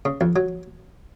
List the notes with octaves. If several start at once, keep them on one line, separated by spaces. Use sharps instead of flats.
C#3
F2
F#3